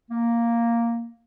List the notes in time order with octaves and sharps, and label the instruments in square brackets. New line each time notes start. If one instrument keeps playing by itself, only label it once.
[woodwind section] A#3